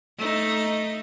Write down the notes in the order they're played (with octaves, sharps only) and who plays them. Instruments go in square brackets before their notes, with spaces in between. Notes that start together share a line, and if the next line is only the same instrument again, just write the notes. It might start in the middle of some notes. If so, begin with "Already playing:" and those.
[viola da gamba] A3 D#4